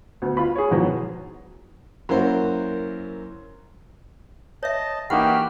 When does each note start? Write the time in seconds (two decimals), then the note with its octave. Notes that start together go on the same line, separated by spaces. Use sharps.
0.22 D2 B3
0.37 F4 B5
0.55 G#4 C#5
0.71 F2 G#2 B2 E3 F#3
2.09 F#2 A#3 E4 F#4 C5
4.63 C#5 D#5 E5 A5
5.10 E3 A#3 D#4 F#4 G4 F#5 B5 F6